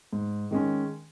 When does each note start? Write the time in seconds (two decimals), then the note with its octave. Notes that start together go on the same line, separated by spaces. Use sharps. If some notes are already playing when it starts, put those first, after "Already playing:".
0.13 G#2
0.51 D#3 G#3 C#4